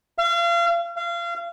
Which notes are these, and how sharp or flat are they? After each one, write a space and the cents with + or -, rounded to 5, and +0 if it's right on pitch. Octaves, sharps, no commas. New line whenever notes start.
F5 -35
F5 -30